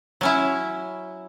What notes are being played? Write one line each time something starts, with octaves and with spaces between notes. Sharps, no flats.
F#3 C#4 E4